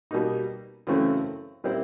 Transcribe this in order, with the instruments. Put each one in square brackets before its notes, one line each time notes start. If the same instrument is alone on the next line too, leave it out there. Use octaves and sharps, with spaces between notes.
[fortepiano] B2 G3 A#3 D#4
F#2 C#3 E3 A3 C4
A#2 G3 C4 E4